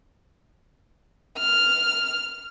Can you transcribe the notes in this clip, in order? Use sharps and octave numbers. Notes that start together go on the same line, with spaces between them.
F6